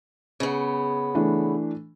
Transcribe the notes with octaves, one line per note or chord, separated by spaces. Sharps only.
C#3 B3
E3 A3 D4